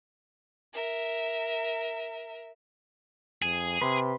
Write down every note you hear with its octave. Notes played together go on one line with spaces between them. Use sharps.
A#4 E5
F2 G#4
C3 B4 C6